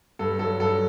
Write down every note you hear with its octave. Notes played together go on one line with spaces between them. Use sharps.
G2 A4
F#3 A4
G2 A4